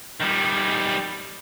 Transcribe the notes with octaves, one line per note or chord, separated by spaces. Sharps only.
D#3 G3